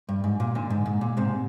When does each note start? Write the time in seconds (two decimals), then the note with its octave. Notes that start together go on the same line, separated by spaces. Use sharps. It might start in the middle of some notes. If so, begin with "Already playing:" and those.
0.09 G2
0.24 G#2
0.40 A#2
0.55 A#2 D3
0.70 G#2
0.86 G#2
1.01 A#2
1.17 G#2 C3